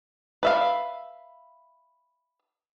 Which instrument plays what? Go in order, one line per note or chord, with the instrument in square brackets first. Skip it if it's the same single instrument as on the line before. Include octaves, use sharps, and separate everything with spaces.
[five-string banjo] B4 E5 F5